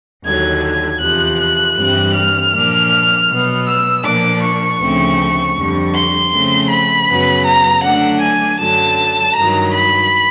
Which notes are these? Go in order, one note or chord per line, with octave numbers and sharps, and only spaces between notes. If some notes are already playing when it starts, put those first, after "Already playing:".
D#2 D3 F#3 G#6
G#6
E2 C3 F3 F#6
F#6
G2 E3 G3 C4
F6
A#2 F3 A#3 D4
B2 F#3 B3
E6
A#2 F3 A#3 D4 D6
C#6
D2 C#3 F3 A3 C4
F2 D3 G3
C6
C#3 F3 A3 C4
B5
F#2 C#3 F#3 B3
A#5
D3 F#3 A3 D4 F#5
G#5
F#2 D3 F#3 A5
G2 D#3 F#3 A#5
B5